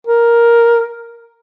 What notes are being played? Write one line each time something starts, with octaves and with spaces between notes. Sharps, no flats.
A#4